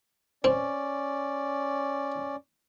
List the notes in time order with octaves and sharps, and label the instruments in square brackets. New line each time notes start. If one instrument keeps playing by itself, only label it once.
[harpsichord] C4 [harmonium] C#4 D5